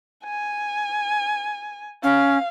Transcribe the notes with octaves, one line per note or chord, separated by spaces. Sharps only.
G#5
C#4 F5